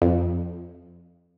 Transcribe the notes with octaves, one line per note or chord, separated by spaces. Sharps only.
F2